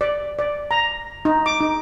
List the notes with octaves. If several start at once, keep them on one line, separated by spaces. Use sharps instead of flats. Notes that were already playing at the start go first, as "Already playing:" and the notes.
D5
D5
A#5
D#4
D6
D#4